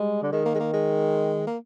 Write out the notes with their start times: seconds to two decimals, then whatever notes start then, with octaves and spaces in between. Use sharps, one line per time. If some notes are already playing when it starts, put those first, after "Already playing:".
Already playing: G3 G#3
0.23 D3
0.32 D#3 G#3
0.45 A#3
0.54 G#3
0.60 A#3
0.73 G#3
1.47 A#3